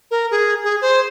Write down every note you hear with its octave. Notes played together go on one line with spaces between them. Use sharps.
A#4
G#4
G#4
C5